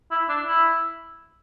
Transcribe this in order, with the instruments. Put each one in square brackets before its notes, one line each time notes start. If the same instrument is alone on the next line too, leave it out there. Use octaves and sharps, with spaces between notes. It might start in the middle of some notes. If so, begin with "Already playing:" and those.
[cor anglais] E4
D4
E4